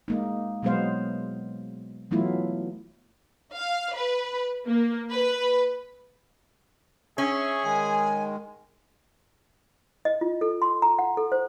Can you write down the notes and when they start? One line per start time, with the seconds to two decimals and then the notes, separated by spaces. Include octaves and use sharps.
0.08 G#3 A#3 D#4
0.63 B2 F#3 G#3 B3 C5 F5
2.11 E3 F#3 A3 B3 E4 F4
3.56 F5
3.95 B4
4.69 A#3
5.12 B4
7.18 C#4 G#4 E5 C#6
7.64 D#3 G#3 G#5
10.05 D#5
10.21 F4
10.41 A4
10.62 C6
10.82 A#5
10.99 F#5
11.17 A4
11.32 C5